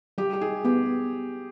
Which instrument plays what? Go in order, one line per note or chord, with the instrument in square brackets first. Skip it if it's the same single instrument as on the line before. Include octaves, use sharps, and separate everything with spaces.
[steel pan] G3 [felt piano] G4
[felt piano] G4
[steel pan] D#4 [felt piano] G#4
[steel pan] B3 [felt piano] G4